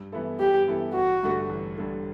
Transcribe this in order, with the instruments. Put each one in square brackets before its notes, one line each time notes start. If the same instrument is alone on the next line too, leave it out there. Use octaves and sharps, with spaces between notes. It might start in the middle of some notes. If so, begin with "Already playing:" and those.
Already playing: [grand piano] G2
E3 B3 E4 A4
[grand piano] G2 [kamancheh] G4
[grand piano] E3 B3 E4 A4
[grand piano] A1 [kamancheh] F#4
[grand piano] G2 D3 A3
A1
G2 D3 A3